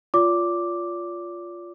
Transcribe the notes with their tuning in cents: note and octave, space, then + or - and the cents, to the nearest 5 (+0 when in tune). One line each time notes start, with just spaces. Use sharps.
F4 +0 D5 -40 D6 +0